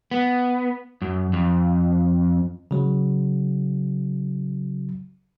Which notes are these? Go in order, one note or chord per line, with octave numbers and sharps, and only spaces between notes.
B3
F#2
F2
C#3 F#3